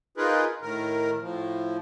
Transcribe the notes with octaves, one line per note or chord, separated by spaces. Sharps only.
D#4 F4 G#4 A#4 B4
A2 D#3 A#4
A2 F3